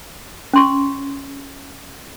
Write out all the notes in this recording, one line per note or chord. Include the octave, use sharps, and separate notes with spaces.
C#4 C6 C#6